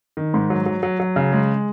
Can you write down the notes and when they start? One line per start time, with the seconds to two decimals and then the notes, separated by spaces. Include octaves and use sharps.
0.17 D#3
0.34 G#2
0.50 F#3
0.66 F#3
0.83 F#3
1.00 F#3
1.16 C#3
1.33 G#3